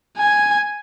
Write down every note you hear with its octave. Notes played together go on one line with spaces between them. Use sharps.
G#5